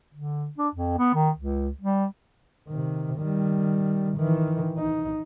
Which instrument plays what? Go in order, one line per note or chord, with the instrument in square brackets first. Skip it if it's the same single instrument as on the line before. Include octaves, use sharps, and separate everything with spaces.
[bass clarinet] D3
D4
F2
B3
D#3
C#2
G3
[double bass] C3 D#3
D#3 G3
D#3 E3
D#4